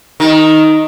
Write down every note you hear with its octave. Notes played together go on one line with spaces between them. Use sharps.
D#3